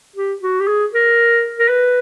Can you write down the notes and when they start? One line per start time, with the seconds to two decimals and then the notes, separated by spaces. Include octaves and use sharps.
0.16 G4
0.41 F#4
0.60 G4
0.67 G#4
0.93 A#4
1.59 A#4
1.68 B4